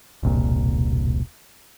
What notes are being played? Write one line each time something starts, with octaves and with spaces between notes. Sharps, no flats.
E1 C2 A#2